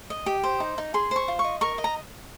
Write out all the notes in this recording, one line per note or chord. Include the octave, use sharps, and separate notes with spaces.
D#5
G4
C5
D#4
D#4
G#4 C6
C5 C#6
F4
C#6
D#5
A#4 C#6
D#5
A#5